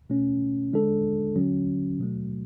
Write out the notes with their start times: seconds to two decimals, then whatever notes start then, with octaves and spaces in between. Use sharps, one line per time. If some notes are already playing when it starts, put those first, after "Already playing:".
0.10 B2 A3 C#4
0.73 D3 G#3 D4 A4
1.36 D3 F#3 C#4
1.99 B2 F#3 A3